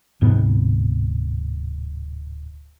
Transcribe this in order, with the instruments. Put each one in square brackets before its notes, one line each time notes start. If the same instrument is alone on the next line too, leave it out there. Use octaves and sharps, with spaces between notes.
[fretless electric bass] D1 G#2 C3 B3